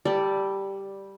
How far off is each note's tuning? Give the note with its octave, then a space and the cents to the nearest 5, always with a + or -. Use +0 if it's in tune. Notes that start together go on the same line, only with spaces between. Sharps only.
G3 +0 A4 +20 D5 -5